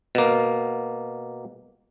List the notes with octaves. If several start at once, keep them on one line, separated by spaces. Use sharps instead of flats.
B2 A#3